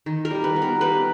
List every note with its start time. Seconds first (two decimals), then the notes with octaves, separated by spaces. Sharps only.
0.06 D#3
0.25 A#4
0.31 G3
0.44 B4
0.56 B3
0.62 A#4
0.81 G3 B4